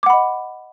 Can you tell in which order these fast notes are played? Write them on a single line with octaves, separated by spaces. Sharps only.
D6 F#5 B5 D#5